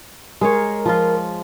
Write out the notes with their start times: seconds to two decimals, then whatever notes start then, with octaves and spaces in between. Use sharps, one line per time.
0.41 G#3 G#4 A#4 C#5
0.86 F3 F4